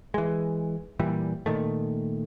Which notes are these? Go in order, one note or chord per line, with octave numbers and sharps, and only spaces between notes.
E3 G#3
A#2 E3 G3
A#2 D#3 A3